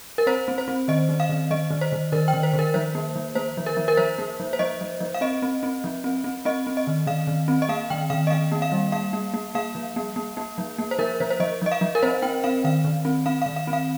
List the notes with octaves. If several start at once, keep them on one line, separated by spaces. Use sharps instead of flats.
A#4
C4 C5
C4
C5
C4
D#3 D#5
D#3
F5
D#3
D#3 D#5
D#3
C5
D#3
D#3 A#4
G5
D#3
C5
D#3
A#4
F3 C5
A#3
F3
A#3 C5
F3
A#4
F3
A#4
F3 C5
A#3
F3
C5
F3 D#5
F3
F3
F5
C4 D#5
C4
C4
F3
C4
C4
C4 D#5
C4
D#5
D#3
D#3 F5
D#3
C4
D#5
A#3 F5
D#3 G5
D#3 F5
D#5
D#3 F5
A#3
F5
G3
A#3 F5
A#3
A#3
A#3 F5
F3
A#3
A#3
A#3
F3
A#3
C5
F3 A#4
F3 C5
C5
F3 D#5
F3 D#5
F5
F3
A#4
C4 C5
C4 G5
C4 F5
D#3 F5
D#3
C4
C4 F5
D#3 F5
F5
C4
F5